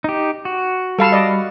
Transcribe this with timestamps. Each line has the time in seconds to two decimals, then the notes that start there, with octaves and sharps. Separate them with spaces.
0.04 D#4 G4
0.45 F#4
0.99 G3 A4 F5 A5 B5
1.12 D5 D#5